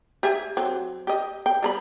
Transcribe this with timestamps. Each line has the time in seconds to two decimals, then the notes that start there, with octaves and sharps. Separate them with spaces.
0.23 G4 E5 G#5
0.57 F#3 C4
1.07 G4 D#5
1.46 G5
1.62 G3 A#5 B5